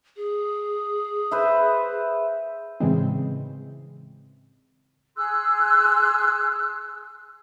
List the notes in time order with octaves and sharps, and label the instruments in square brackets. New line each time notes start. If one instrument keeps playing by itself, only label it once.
[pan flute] G#4
[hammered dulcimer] B4 C5 E5
[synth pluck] A2 C#3 E3 G#3 C4
[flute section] G#4 C6 E6 F#6